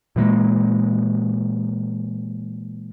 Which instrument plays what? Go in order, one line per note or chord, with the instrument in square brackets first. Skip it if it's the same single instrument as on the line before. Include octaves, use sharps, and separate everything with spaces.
[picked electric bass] A#2 E3 G#3 A#3